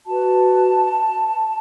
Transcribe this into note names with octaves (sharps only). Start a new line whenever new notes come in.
F#4 B4 A5